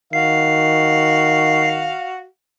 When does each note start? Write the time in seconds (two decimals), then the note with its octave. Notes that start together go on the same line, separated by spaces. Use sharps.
0.13 D#3 F#4 F5 C7